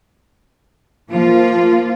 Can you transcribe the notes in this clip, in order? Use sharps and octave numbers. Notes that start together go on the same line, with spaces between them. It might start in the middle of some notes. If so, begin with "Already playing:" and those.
F3 A#3 F4